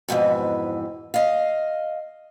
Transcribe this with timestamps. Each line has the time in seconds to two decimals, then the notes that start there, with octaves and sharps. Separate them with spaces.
0.08 F2 G#2 B2 E3
1.14 D#5 F5